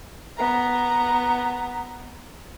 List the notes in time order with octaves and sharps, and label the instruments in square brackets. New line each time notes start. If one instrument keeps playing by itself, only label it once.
[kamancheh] B3 A#5